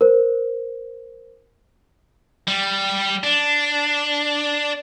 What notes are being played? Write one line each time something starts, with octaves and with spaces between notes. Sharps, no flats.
A#4 C5
G3
D4